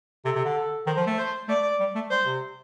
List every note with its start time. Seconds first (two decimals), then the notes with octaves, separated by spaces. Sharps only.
0.25 C3 A4
0.36 C3
0.45 D3
0.56 A4
0.87 D#3 C5
0.97 F3
1.07 A3
1.18 C5
1.48 A3 D5
1.80 G3
1.95 A3
2.10 G3 C5
2.25 C3